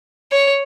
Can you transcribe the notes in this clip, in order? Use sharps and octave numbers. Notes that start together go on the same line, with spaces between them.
C#5